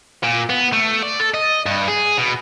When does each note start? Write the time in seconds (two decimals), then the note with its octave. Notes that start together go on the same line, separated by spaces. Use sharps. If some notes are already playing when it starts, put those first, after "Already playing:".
0.23 A#2
0.50 B3
0.73 A3
1.03 D5
1.20 A4
1.34 D#5
1.66 G2
1.88 G#4
2.17 B2